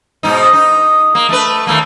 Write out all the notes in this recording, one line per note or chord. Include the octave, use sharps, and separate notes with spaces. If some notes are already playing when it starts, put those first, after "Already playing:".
G#2 B2 D#4
D#4
A#3
A3 B4
D#2 A3 A#3